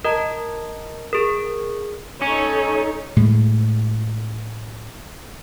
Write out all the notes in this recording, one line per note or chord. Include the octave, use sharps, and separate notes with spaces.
A#4 D#5 A5 A#5
G#4 A#4
C#4 D#4 A4 C#5
A2 G#3